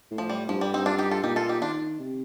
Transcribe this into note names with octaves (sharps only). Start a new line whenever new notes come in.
A2
F3
G3
G2 F3
G3
C4 D#4
D4 F4
D#4 G4
F4 A4
A#2 D#4 G4
F4 A4
D#4 G4
D#3 D4 F4
C3